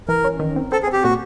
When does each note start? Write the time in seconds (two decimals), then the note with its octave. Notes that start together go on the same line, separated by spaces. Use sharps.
0.08 E3 A#4
0.24 C#4
0.39 D#3
0.56 C4
0.72 C4 A4
0.83 G#4
0.87 C4
0.93 G4
1.03 A#2 F#4